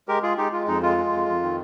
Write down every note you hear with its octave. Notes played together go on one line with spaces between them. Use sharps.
G#3 G4 A#4
G#3 F4 G#4
G#3 D#4 G4
G#3 F4
F2 D#4
G#3 F4
G#3
F2
F2
D#3